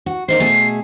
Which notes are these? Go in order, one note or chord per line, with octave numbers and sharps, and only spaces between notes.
F#4
A#3 D#4 C5 C7
B2 A3 G#4